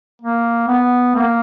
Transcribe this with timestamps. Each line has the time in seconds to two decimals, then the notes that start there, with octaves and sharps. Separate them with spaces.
0.22 A#3
0.68 B3
1.15 A#3